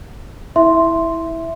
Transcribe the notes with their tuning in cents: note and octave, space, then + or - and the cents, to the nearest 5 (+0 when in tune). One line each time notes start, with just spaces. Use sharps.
E4 -10 E5 +5 C6 +0